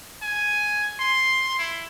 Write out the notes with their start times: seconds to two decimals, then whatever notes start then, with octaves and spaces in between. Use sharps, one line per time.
0.22 G#5
1.00 C6
1.59 E4